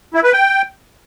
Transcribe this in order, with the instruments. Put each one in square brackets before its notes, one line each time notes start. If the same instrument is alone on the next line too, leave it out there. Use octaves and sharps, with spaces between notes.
[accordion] E4
B4
G5